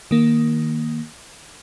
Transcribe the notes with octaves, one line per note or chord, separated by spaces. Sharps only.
D#3 A#3